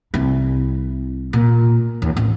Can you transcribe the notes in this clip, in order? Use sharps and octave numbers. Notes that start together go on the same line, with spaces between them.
C2 E4
A#2
D#2
A1